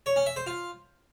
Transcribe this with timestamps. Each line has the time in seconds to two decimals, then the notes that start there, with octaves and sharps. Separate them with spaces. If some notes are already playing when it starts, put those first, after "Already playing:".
0.06 C#5
0.16 C#4
0.26 E5
0.36 C5
0.46 F4